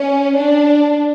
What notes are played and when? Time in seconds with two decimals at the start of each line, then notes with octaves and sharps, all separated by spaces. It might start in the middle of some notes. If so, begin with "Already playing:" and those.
Already playing: C#4
0.37 D4